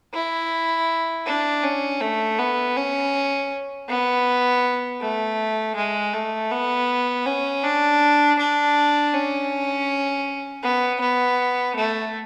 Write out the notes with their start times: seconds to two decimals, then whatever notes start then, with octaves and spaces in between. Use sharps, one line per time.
0.14 E4
1.26 D4
1.64 C#4
2.01 A3
2.39 B3
2.76 C#4
3.89 B3
5.01 A3
5.76 G#3
6.14 A3
6.51 B3
7.26 C#4
7.64 D4
8.39 D4
9.14 C#4
10.63 B3
11.01 B3
11.76 A3